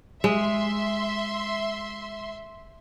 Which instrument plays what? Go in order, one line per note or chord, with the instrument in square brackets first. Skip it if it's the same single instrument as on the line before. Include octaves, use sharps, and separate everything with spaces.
[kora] G#3 [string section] E5 C6